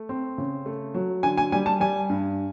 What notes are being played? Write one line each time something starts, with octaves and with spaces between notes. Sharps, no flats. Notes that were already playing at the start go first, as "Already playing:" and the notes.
Already playing: A3
C4
C#3
A3
F#3
D3 G#5
G#5
G3 G#5
A5
G3 G#5
G2